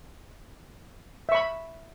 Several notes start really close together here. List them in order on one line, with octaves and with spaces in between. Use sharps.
E5 C#6 B5